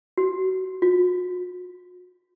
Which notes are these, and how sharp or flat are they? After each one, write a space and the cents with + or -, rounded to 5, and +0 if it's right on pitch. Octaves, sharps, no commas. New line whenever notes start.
F#4 +20
F#4 -45